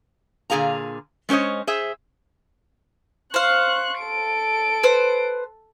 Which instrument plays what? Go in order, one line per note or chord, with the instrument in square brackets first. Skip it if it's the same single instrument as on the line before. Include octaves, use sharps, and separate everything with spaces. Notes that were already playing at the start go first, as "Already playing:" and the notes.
[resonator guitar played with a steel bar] A#2 D3 G#4 F5 A#5
G#3 C#4 C5 C#5 D#5
G#4 C5 E5
[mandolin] C5 F5 [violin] C#6 F#6
[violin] A4 D7
[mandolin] B4 C5